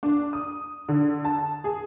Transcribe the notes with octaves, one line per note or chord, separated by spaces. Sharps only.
D4
D#6
D3
A5
G#4